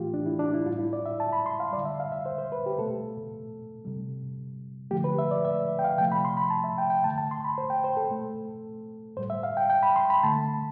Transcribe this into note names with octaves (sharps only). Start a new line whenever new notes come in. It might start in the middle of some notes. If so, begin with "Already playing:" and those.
Already playing: A2 E3 A3 F4 G4
D4
E4
D4
E4
A2 G3 F4
E4
D5
E5
A5
B5
C6
F5
D3 G3 D5
E5
F5
E5
C5
C5
B4
G4
B2 A3 A4
C3 G3
D3 F3 A3 G4
B4
E5
D5
E5
G5
F5
C3 F3 A3 G5
B5
C6
B5
A5
E5
G5
G5
D3 A3 A5
A5
C6
B5
C5
G5
C5
A4
B2 A3
A2 G3 C5
E5
F5
G5
G5
B5
C6
B5
D3 A3 A5